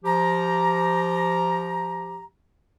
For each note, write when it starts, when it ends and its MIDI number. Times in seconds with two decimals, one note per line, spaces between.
0.05 2.24 53
0.05 2.24 67
0.05 2.24 82